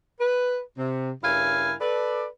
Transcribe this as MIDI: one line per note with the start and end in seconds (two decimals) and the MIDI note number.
0.20 0.60 71
0.78 1.12 48
1.24 1.73 43
1.24 1.73 49
1.24 1.73 64
1.24 1.73 70
1.24 1.73 77
1.24 1.73 80
1.81 2.26 69
1.81 2.26 71
1.81 2.26 74